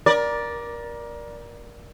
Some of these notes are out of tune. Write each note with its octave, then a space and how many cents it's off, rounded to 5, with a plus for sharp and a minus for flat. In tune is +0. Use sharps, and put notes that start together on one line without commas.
A#4 +25 D5 +0